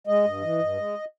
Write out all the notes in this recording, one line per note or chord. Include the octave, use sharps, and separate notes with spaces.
G#3 D#5
G2
E3
G2
G#3